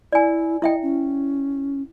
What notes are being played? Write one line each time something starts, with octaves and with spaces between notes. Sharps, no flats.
E4 D5 G#5
E4 D#5 E5 G5
C#4